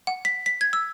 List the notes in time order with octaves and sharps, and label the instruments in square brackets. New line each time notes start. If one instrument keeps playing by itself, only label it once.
[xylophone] F#5
B6
B6
G#6
E6